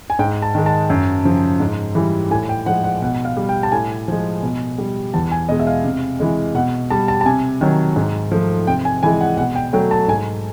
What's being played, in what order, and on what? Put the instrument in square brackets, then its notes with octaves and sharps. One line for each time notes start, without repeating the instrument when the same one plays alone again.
[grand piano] G#5
G#2 G5
A5
D#3 G#3
A5
F#2
C#3 F3
G#2
E3 G3
A2 G#5
G5
F3 G#3 F#5
F#5
B2 F#5
F5
G3
G5
A5
A2 G#5
F3 G#3
B2
G3
E2 A5
G#5
B2 G#3 D#5
E5
F5
C3
E3 G#3
B2 F#5
G3 A5
A5
A5
C3 G#5
D#3 F#3
G#2
F3 A3
C3 G5
G#5
E3 G#3 G#5
F#5
B2 F#5
G5
F#3 A3 G5
A5
G#2 G#5